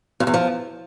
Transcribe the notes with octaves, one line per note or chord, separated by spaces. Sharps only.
F2
E2
F3